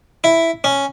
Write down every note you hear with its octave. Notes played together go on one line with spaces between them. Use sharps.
E4
C#4